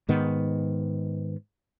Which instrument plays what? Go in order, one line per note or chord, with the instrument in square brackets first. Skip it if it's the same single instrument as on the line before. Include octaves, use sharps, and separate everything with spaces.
[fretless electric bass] G#2 D#3 B3